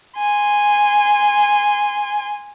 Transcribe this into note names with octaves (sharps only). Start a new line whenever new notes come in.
G#5 C6